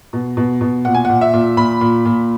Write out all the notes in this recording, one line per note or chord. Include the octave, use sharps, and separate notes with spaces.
B2
B2
B2
A#2 F#5
G#5
A#2 F#5
E5
A#2
A#2 B5
A#2
A#2